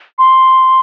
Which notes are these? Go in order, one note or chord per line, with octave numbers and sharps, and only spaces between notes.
C6